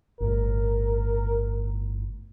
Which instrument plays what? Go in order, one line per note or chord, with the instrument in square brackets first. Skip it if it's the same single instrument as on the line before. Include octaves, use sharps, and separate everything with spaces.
[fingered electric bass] G1 A2 [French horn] A#4